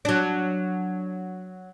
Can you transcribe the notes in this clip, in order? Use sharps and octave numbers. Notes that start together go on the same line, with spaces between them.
F#3 D4